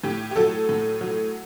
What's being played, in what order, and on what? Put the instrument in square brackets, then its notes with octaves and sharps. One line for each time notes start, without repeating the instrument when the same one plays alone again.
[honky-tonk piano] A2 G4
G4
F#3 A4
A2
F#3